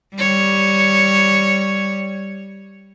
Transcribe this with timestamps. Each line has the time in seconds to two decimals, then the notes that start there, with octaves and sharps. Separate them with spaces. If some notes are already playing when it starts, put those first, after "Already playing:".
0.15 G3 C#5